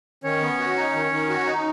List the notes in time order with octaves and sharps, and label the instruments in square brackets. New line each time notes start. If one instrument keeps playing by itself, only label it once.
[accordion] D#3 [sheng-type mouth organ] C#4 C#5
[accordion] B3
F#4
D#4
D#3
D#3
F#4
D#4